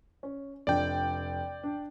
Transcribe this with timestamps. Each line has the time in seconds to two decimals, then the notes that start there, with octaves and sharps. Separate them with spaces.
0.23 C#4
0.67 F1 D4 D5 G5
1.63 D4